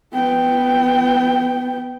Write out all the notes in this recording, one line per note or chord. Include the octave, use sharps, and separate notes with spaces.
B3 G5